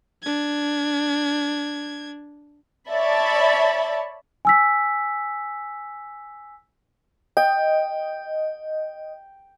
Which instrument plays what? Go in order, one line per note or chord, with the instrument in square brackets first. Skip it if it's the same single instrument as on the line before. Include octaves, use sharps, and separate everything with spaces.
[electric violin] D4 G#6
[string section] C#5 D5 E5 A5 B5 A6
[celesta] G#5 E6 B6
[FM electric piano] D#5 [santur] G5